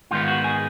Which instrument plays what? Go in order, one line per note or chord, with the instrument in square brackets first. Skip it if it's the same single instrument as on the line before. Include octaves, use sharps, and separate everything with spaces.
[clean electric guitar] G#2 D#3 G#3 B3 F4
F#4
G#4